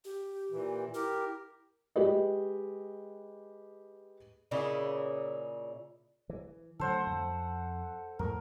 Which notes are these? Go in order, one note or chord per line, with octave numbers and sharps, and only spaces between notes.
G4
A#2 E3
E4 G4 A#4
G#3 G4 B4 D#5
A#2 C#3 D#4 E4
E3
D3 F#3 A3 A4 C5 F#5
F2
F2 A2 A#4